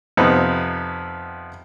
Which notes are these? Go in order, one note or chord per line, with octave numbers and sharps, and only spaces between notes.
F2 C3 B3 D#4